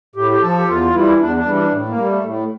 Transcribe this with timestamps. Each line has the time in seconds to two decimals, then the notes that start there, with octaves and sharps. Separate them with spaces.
0.16 A2 G4
0.31 G4
0.41 F3 A4
0.58 G4
0.67 E2 F4
0.93 E3 G3 E4
1.19 E2 D4
1.36 D4
1.45 E3 G3
1.55 D4
1.71 A2
1.89 A#3
1.97 G3
2.06 A3
2.23 A2